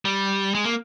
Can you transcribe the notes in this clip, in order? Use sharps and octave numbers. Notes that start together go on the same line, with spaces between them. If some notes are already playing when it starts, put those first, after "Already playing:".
G3
G#3
A#3